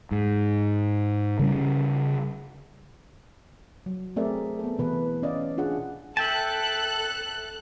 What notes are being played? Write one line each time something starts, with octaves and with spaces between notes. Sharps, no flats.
G#2
C#3 G3 C#4
F#3
A3 C4 G#4 A#4 D5 E5
B3 A4
B2 E3 B4
C#4 D5 D#5 F5
D4 F4 G#4 F#5
A4 E5 G5 A5 F#6